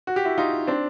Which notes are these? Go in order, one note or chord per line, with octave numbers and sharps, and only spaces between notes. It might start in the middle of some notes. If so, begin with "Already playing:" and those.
F#4
G4
E4 F#4
D#4 F4
C4 D4